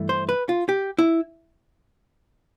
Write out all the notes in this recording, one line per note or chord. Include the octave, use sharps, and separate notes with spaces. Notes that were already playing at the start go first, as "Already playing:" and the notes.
Already playing: G2 E3 A3
C5
B4
F4
G4
E4